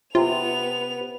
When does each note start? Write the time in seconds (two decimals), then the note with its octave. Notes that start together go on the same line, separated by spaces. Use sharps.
0.15 C3 B3 F4 F7